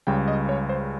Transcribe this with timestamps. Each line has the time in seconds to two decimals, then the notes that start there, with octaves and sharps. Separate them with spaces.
0.07 C#2 C#3 G3 G5
0.28 D#5
0.49 C#5
0.69 C5